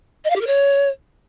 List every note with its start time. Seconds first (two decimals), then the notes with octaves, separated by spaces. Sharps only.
0.25 D#5
0.30 F5
0.36 G4
0.41 A#4
0.47 C#5